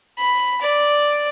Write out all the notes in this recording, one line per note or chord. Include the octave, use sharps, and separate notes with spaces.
B5
D5